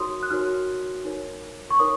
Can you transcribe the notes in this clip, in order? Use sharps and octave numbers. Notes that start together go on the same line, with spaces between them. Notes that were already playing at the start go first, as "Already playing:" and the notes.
Already playing: D#4 F#4 A#4 C#5 C6 D#6
F#6
D#4 F#4 A#4 C#5 F6
D#4 A#4 C#5
C#6
D#4 A#4 C#5 D#6